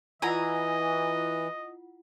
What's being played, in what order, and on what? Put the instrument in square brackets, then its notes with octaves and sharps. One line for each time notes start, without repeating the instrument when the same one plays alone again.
[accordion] E3 [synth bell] E4 F4 F#5 [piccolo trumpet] D#5 [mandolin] G#5 A#5